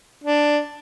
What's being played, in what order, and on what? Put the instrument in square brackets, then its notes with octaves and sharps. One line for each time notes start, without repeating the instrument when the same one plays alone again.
[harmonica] D4